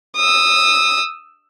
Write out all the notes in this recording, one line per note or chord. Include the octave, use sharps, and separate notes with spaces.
D#6 E6